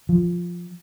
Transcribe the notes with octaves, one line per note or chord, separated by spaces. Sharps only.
F3